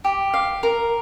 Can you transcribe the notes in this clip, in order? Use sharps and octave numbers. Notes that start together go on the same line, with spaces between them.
G4
F5
A#4